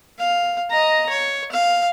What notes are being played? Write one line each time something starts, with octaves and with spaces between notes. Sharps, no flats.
F5
D#5 A#5
C#5
F5